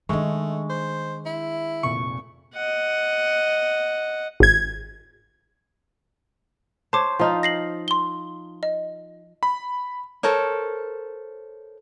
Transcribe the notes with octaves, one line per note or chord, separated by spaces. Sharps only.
D#3 G#3 A3 D4 D#5 C#6
C5
E4
F1 A#2 C#6
D#5 F#5
G#1 G#6
C5 C#5 A5 D6
F3 D#4 F4
A#6 C7 F#7
C6 G7
D#5
B5
A4 A#4 C5 C#5